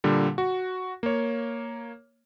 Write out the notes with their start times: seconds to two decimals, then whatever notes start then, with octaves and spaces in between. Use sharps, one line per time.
0.04 A#2 D3 G3
0.38 F#4
1.03 A#3 C#5